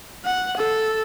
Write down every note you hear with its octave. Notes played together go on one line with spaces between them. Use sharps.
F#5
A4